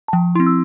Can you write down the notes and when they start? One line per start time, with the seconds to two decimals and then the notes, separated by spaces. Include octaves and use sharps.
0.08 A5
0.13 F3 G5
0.35 E4 C6
0.40 C4
0.46 E6